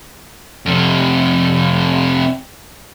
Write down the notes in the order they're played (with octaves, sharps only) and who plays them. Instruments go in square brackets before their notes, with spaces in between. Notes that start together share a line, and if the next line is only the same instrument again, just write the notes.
[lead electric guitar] F2 C3